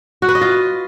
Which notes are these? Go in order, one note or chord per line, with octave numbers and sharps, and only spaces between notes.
F#4
B4
D#5
F4